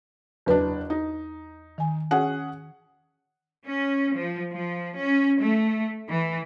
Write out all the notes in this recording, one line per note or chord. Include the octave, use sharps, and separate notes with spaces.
F#1 E2 D4 B4
D#4
D#3 G#5
C#4 G#4 F#5
C#4
F3
F3
C#4
A3
E3